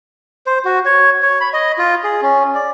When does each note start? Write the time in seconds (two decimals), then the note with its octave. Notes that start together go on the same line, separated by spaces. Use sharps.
0.46 C5
0.65 F#4
0.85 C#5
1.23 C#5
1.40 B5
1.53 D#5
1.78 F4
2.04 G#4
2.22 C#4
2.55 D5